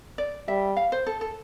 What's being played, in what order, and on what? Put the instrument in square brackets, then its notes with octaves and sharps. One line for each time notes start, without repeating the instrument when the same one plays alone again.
[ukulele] D5
[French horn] G3 [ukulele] E5
[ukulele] F5
C5
A4
A4